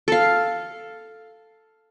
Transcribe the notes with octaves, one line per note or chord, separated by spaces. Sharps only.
A4 F5